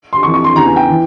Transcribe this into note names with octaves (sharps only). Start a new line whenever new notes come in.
C6
F2 E3 C#6
C#6
C6
E2 C#3 E3 A#5
G#5
G5
E3